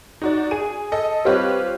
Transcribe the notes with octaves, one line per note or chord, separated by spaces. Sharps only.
D#4 F#4 D5
G#4 D#7
A4 D#5
G3 C4 F4 G4 B4 C#5